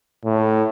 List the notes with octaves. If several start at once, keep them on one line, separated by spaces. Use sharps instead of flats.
A2